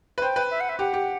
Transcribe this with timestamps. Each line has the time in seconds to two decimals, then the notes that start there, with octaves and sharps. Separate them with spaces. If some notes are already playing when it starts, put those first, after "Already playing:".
0.18 B4
0.22 C5 G5
0.36 B4
0.50 E5
0.60 F#5
0.69 E5
0.79 G4 F#5
0.93 G4